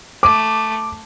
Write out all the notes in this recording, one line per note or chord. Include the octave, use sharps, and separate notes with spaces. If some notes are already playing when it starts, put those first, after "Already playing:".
A3 D6